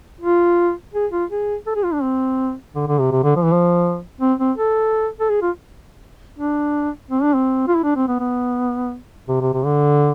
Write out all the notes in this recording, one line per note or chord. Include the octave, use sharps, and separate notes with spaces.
F4
G#4
F4
G#4
A4
G#4
F4
D4
C4
D3
D3
C3
C3
D3
F3
E3
F3
C4
C4
A4
A4
G#4
F4
D4
C4
D4
C4
F4
E4
D4
C4
B3
B3
C3
C3
C3
D3